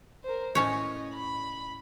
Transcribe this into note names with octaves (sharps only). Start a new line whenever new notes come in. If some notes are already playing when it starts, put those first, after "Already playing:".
A#4 C5
A2 C#4 C#5 D#5
B5